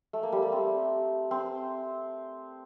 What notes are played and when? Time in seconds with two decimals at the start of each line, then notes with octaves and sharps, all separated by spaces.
0.13 A3
0.23 A#3
0.32 G3
0.42 A3
0.52 C4
1.31 C4